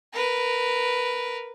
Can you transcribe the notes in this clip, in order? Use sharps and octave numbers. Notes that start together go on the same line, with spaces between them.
A#4 B4